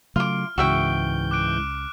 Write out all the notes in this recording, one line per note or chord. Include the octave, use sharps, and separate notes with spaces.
C#3 F#3 A3 F4 D6 F6
C#2 G#2 C#3 E3 F#4 E5 G5 G6
D6 F#6 D7